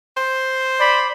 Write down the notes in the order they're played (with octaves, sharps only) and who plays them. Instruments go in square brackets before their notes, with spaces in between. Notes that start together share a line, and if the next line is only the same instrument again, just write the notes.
[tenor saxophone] C5
[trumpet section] D5 B5